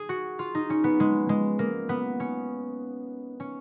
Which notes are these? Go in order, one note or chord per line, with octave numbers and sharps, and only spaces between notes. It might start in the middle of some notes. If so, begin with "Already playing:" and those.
Already playing: G#4
F#4
F4
D#4
C#4
B3
G#3
G#3
A#3
B3
C#4
C#4